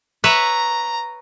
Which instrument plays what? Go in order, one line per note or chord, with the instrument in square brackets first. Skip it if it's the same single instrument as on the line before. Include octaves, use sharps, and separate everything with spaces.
[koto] B4 C#5 E5 [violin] A#5